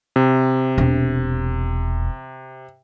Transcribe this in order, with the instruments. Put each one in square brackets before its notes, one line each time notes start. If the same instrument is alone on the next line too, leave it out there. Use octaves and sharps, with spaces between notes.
[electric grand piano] C3
[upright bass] E1